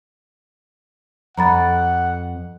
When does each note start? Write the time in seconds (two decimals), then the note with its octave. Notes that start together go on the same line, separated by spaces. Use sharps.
1.37 F2 F#5 A#5 B5 A6